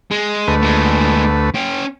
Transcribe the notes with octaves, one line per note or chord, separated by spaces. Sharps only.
G#3
D2 A3 B4
A#2 G#3
C#4 G5